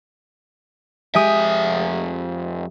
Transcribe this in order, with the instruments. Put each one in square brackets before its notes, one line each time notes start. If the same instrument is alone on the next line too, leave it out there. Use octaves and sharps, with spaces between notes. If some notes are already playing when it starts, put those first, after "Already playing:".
[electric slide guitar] F2 E5 [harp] G#3 G4 D#6